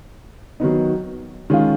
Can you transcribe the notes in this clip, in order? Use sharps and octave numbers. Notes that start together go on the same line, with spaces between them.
D#3 F#3 B3 D#4
D#3 G#3 C#4 F4